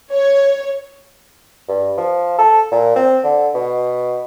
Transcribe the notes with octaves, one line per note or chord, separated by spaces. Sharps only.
C#5
G2
F3
A4
A#2
C4
D3
B2